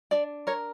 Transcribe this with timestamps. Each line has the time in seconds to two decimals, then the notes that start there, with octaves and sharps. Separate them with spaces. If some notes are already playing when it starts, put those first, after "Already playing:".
0.11 D4 D5
0.47 A#4 C#5